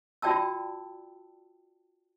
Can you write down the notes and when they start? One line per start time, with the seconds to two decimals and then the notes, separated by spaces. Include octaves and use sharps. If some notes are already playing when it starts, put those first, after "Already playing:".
0.22 F4 F#4 D5 G5 A5 E6